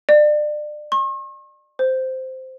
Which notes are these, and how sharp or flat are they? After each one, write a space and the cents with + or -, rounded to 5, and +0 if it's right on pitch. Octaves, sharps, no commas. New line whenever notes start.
D5 +30
C#6 -45
C5 -5